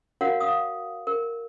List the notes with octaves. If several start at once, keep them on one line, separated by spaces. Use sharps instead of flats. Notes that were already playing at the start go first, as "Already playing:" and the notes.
F#4 A#4 C#5 F5 F#5
F5 D#6
A#4